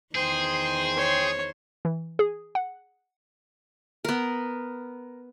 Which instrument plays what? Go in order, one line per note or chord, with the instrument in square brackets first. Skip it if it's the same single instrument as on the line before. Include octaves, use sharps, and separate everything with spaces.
[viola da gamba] E2 D#3 C5 [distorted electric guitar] G#4 [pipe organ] G5 C6
[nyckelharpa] C#5
[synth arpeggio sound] E3
G#4
F#5
[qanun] B3 A#4